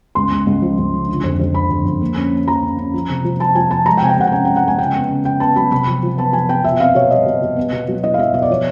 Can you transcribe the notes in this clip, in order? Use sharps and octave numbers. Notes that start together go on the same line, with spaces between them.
C#2 C6
C#2
C#2
F3
C#2
C#3
D3
F2
F2
D3 B5
F2
F2
A#3
C#4
A#3
F3 A#5
C#4
C#4
F3
C3
F3
F3 A5
F3 G#5
F3 A5
G#3 A#5
G5
C3 G#5
G5
C3 F#5
G5
C#4 G#5
G#3 G5
F#5
G#3 G#5
C#3 G5
B3
C#3
C#3 G5
B3 A5
F#3 B5
C3 B5
F3
F3
B3 A5
F3 G#5
B3 G5
B2 E5
C4 F5
B2 C#5
G3 D#5
B2
B2
B3
B2
F#3
E4 D#5
F5
F#3 E5
B2 D#5
D5
F3 C#5